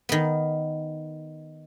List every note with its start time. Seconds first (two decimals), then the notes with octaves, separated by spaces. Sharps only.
0.09 D#3 B3